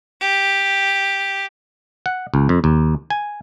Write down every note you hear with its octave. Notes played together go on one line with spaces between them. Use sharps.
G4
F#5
C#2
F2
D#2
G#5